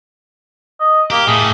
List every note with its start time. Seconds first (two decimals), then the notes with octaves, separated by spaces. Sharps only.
0.80 D#5
1.11 A#3 G4
1.27 A2 G#4